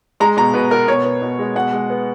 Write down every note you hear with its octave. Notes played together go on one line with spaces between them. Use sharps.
G#3 A#5
B2 A#5
B2 B4
B3 A#4
B2 C#5
B3
B2
G#3
B2 F#5
G#3
B3